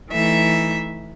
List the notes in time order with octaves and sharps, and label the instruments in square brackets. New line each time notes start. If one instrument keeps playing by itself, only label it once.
[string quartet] E3 A3 D#4 E5